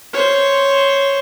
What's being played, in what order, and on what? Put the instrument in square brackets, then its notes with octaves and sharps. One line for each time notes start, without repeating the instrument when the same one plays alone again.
[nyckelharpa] C5 C#5